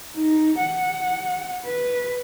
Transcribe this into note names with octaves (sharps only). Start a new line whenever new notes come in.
D#4
F#5
B4